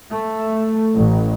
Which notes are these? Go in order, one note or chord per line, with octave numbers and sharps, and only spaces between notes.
A3
A1